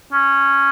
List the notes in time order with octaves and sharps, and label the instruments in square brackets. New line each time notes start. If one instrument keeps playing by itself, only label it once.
[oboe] C#4